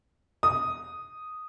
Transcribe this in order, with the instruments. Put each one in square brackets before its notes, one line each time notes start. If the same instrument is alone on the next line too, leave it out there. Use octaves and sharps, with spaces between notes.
[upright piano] D#6